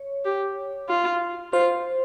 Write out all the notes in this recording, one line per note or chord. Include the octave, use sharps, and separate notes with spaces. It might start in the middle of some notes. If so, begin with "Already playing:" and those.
Already playing: C#5
G4
F4
F4 C5